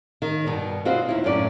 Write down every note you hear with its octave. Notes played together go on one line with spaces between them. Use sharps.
D#3
G2 B2
C4 D#4 F4 F#4 B4 C5
D#2 E4
F#2 A2 C#4 D5